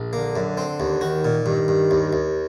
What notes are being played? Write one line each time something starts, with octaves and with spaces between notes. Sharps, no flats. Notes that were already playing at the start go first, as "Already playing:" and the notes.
Already playing: A#1
D3 A#3
F#2
C4
D#2
D#3 F#4
A#2
G2 D#3
G2
D#2
D#2